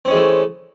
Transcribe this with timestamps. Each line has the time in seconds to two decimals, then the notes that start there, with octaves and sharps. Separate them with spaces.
0.05 C4
0.08 C#4
0.11 G#3
0.13 E3
0.16 A3